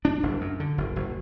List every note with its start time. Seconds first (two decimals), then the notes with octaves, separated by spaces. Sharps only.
0.05 F#1 D4
0.23 F#1
0.41 F#2
0.60 D3
0.78 F#1
0.96 F#1